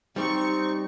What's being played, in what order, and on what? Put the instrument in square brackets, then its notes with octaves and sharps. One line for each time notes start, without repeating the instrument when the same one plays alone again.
[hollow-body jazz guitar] G3 G4 [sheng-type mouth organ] C4 [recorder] D#4 [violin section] C#6